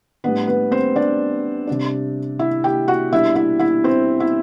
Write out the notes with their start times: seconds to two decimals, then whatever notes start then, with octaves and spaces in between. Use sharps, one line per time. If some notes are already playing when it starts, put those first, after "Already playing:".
0.24 A2 G3 B3 D4 B4
0.47 B3 B4
0.71 C4 C5
0.96 D4 D5
1.67 C3 G3 D4
2.39 E4 E5
2.64 G4 G5
2.88 F#4 F#5
3.11 B2 G3 D4 E4 E5
3.35 E4 E5
3.60 E4 E5
3.84 C4 C5
4.20 E4 E5